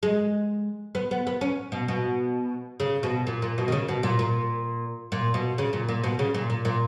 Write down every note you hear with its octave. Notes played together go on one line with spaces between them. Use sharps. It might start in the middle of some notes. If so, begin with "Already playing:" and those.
G#3
B3
B3
B3
C#4
B2
B2
C#3
B2
A#2
A#2
B2
D#3
C#3
B2
A#2
A#2
A#2
B2
C#3
A#2
A#2
B2
C#3
A#2
A#2
A#2